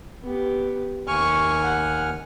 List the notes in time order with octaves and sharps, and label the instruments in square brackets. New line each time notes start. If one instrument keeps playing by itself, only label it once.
[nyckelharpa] B3 G4
[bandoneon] D#2 G#5 F6 [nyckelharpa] C#6
[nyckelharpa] F#5